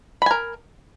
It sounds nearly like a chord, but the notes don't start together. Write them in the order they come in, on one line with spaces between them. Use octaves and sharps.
B5 G#5 A#4